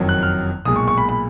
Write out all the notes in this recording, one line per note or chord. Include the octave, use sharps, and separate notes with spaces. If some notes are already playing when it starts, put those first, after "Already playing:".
Already playing: F#1 F2 D#3 F#3
F#6
F6
B1 A#2 G#3 D#6
C#6
C#6
B5
B5